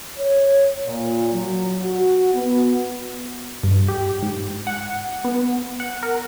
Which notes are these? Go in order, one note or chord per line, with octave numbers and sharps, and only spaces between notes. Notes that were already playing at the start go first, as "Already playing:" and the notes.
C#5
A#2
F#3
F#4
B3
G2
G4
G#2
F#5
B3
F#5
A#4